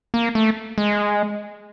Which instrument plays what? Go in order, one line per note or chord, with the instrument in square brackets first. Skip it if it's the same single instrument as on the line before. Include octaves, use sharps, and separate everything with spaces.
[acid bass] A#3
A3
G#3